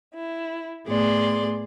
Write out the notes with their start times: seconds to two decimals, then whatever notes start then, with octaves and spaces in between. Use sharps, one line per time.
0.15 E4
0.87 A2 B3 G#4 D5 C6